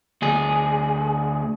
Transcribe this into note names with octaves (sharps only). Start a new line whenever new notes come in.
D2 G#4